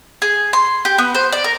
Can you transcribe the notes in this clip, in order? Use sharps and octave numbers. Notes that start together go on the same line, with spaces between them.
G#4
C6
G4
B3
C5
D5
A#4